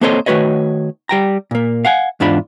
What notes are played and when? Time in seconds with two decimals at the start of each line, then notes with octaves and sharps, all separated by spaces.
0.01 A#3 C4 A4 C5 C#5 D#5
0.26 D#3 A3 F#4 B4 C#5 D#5
1.09 G3 G5 A#5
1.51 A#2 A#3
1.85 F5 F#5 G#5
2.20 E2 G#2 D4 F4 B5